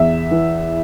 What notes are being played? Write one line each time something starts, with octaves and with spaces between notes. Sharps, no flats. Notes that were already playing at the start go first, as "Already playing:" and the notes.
Already playing: E2 E5
E3